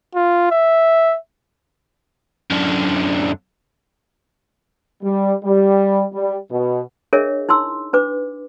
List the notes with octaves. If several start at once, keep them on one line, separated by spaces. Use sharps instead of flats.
F4
E5
F#2 D3
G3
G3
G3
B2
D4 G#4 A#4 C#5 D#5 E5
D#4 E4 C6 E6
D4 B4 D6